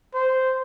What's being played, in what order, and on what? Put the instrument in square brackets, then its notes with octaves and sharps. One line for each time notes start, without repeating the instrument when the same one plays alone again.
[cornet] C5